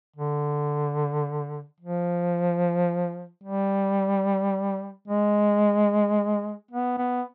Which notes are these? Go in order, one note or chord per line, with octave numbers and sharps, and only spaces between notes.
D3
F3
G3
G#3
B3
B3